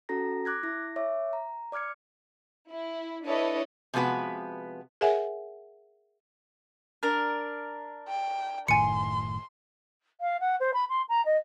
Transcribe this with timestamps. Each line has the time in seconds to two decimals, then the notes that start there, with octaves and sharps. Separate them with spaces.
0.09 C#4 F#4 A4 A#5 A#6
0.45 D6 F#6 G#6 A#6
0.63 E4 A#6
0.96 C#5 E5 D6
1.33 A#5
1.72 D5 D6 F6 G#6 C#7
2.69 E4
3.24 D4 E4 A4 B4 C#5 D#5
3.93 C3 F3 G#3 B3 F#4 B4
5.01 G#4 A#4 C#5 E5 F#5 G#5
7.03 D4 A#4
8.09 G5
8.68 F#1 A2 D#3 G#5 C6 C#7
10.21 F5
10.40 F#5
10.60 C5
10.73 B5
10.89 C6
11.09 A#5
11.25 D#5